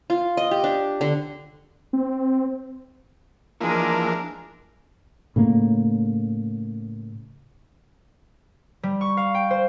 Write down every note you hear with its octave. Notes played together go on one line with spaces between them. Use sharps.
F4
D#5
G4
D4
D3
C4
E3 F3 G#3 A#3 D4 A#4
A2 C#3 A#3
G3
C#6
F5
G5
C5